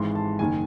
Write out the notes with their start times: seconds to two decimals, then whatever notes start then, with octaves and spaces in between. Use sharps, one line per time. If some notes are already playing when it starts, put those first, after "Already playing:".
Already playing: G#1 G#2 E3 C6
0.15 A5
0.39 F#1 D#3 G#5